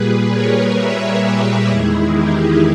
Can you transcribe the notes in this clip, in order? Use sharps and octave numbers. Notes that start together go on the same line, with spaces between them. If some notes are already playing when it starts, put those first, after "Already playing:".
Already playing: A#2 G3 G#4 B4
A#4 C#5
C#5 E5
G4 A#4
E2 D#3 G#3 E4 G#4
D#4 G4